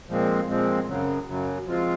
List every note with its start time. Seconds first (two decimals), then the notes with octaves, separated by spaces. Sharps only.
0.09 A#2 F3 G#3 C4
0.49 A#2 F3 G#3 C4
0.88 F#2 C#3 F#3
1.27 F#2 C#3 F#3
1.67 F3 G#3 C4 F4